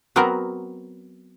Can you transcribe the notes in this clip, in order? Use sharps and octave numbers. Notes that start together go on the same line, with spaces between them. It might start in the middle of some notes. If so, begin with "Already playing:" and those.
F#3 B3 C4 F#4 A#4